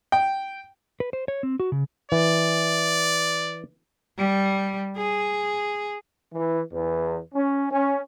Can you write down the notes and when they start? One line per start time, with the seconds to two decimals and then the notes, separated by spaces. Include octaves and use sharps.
0.12 G5
1.00 B4
1.13 C5
1.28 C#5
1.43 C4
1.60 F#4
1.72 C#3
2.12 E3 D5
4.18 G3
4.97 G#4
6.33 E3
6.72 E2
7.34 C#4
7.71 C#4